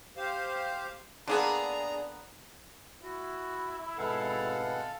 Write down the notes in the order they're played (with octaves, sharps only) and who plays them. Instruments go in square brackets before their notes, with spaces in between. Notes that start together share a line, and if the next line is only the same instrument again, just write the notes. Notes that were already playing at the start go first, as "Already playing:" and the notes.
[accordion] G4 C5 F5
[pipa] D3 A#3 B3 [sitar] D4 G#4 [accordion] A#5
[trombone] E4 [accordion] F#4
[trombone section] G#1 B2 B4 [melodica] G#3 F#5 [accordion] A4 F5